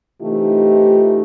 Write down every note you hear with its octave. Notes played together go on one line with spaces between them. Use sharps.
C3 E3 A3 D#4 F4 G4